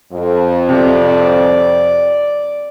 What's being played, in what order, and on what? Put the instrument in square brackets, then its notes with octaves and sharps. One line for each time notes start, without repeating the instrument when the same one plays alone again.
[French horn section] F2
[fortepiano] C3 [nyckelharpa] D5